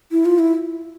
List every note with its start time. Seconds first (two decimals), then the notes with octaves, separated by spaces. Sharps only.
0.12 E4
0.25 F4
0.39 E4